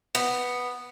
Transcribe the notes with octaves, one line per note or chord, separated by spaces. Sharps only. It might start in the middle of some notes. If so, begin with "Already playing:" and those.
B3